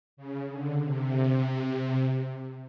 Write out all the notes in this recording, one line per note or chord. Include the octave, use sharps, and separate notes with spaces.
C#3
D3
C3